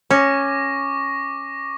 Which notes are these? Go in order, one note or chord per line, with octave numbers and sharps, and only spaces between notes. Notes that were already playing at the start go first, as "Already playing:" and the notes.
C#4 C#6 D6 A#6